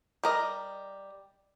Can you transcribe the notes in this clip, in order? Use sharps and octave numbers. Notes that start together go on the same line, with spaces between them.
G3 A#4 D#5